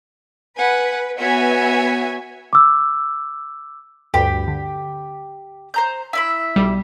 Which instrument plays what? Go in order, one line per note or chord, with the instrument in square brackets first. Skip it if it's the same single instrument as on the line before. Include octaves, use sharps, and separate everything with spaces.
[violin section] B4 [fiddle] F#5 G#5
[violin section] B3 E5 G#5 [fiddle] F#4 C#5
[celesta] D6 E6
[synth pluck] D2 G2 [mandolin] G4 B5
[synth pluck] D3
[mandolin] C5 A#5 G6
E4 E5 B5
[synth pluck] B1 G3